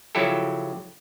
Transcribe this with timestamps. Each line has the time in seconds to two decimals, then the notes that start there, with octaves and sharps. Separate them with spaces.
0.15 C#3 F3 F#3 E4 G4 A4